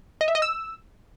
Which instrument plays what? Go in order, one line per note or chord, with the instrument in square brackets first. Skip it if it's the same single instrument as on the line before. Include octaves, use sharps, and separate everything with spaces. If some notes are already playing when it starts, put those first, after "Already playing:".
[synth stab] D#5
E5
D#5
E6